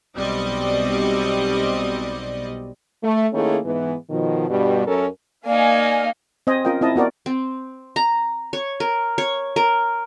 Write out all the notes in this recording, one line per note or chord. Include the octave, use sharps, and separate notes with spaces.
B1 B2 G3 C4 D5 D#5
A3
D#3 A3 A#3 C#4 E4 G#4
G#2 E3 B3
B2 D#3 F3
G2 B2 G3
F#2 F#3 C#4 A4 A#4
A#3 D#4 D5 F5 G#5
C4 C5 D#5 G#5
C#4 F4 A#4 D#5 G5
C4 E4 D#5 A5
B3 F#4 A#4 D5
C4
A#5
C#5
A#4
C#5
A#4